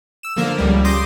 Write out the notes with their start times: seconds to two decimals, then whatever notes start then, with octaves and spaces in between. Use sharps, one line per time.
0.23 E6 E7
0.36 D3 F3 A#3 A#4
0.58 C#2 G3
0.85 C6 D6 D#6 G6 A#6 C7